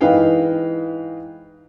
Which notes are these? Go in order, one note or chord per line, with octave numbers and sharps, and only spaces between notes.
G#2 E3 B4 D#5 F5 G5